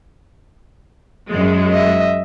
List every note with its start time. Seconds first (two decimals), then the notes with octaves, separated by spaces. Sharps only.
1.29 F#2 G#3
1.72 D#5 E5